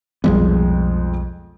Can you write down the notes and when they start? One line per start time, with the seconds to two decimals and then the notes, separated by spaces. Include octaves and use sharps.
0.24 B1 F2 G3 G#3 B3